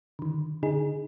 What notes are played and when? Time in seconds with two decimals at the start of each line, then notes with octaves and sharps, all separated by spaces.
0.19 D3 D#3
0.63 D3 D#4 G#4